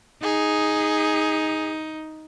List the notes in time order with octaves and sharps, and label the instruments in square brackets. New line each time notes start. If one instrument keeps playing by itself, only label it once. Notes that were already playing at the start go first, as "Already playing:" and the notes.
[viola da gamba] D#4 [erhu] G#4